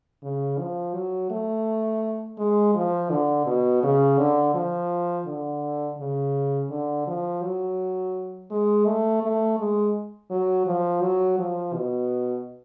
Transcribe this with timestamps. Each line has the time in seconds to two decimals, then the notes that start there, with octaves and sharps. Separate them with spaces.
0.23 C#3
0.59 F3
0.94 F#3
1.31 A3
2.38 G#3
2.75 F3
3.10 D3
3.46 B2
3.83 C#3
4.18 D3
4.55 F3
5.26 D3
5.98 C#3
6.70 D3
7.07 F3
7.42 F#3
8.51 G#3
8.86 A3
9.23 A3
9.59 G#3
10.31 F#3
10.67 F3
11.02 F#3
11.38 F3
11.74 B2